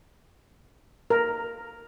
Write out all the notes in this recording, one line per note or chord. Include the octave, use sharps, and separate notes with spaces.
A#4